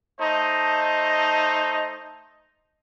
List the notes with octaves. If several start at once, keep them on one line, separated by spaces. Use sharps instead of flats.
A3 D#4 C5 D#5 A5